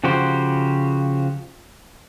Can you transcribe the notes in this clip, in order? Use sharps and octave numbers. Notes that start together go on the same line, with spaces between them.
C#3 F3 F#4 G4 C5